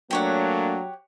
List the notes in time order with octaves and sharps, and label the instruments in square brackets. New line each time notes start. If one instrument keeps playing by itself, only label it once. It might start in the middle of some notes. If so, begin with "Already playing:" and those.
[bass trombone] F#3 [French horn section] A3 A#3 D4 [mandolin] G4 C#5 F#5